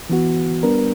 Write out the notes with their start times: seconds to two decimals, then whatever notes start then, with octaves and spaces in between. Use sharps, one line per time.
0.09 E3 B3 F#4
0.63 G3 B3 D4 A#4